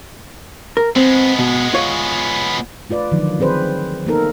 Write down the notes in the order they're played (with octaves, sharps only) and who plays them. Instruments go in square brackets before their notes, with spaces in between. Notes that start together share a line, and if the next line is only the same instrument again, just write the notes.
[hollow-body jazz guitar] A#4
[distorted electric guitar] G#3 B3 [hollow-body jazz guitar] C4
[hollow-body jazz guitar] B2
F4 C#5
[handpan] A3 F4 B4 D5
D3 D#3 F3 F#3
D#3 C4 G#4 B4 C5
A#3 B3 D#4 A4 A#4